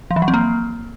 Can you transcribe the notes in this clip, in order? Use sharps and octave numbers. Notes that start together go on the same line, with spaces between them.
F3
E3
F#3
C4
A#3